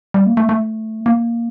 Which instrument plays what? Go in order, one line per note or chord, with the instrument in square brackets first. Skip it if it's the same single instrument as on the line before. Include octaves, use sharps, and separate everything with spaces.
[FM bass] G3
A#3
A3
A3
A#3